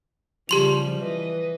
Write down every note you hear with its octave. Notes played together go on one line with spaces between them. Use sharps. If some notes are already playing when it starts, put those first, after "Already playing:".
C#3 F3 G3 G4 C6 F7
E3 B4 D#5